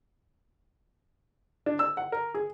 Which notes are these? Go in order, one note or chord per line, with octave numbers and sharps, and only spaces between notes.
D4
E6
F#5
A#4
G#4